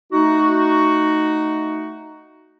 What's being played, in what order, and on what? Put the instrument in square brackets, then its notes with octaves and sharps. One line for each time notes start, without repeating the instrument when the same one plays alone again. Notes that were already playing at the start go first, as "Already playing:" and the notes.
[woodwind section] A3 D#4 F#4